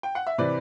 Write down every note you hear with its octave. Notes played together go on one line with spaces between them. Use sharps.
G5
F#5
E5
C3 E3 B4 D5